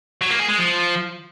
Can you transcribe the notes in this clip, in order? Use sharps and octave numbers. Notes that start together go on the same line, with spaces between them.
F#3
A#3
G#4
G#3
F3